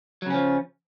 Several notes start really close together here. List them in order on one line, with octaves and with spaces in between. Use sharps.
F#3 C#3 C#4 F3